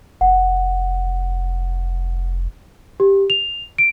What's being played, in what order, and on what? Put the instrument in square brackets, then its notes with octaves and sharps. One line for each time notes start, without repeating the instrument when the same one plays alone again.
[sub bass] F1 [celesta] F#5
[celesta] G4
F7
D7